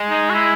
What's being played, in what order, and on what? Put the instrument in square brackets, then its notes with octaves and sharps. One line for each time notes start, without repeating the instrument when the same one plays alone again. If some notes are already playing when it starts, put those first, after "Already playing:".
Already playing: [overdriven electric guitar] G#3
[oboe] D#4
F#4
E4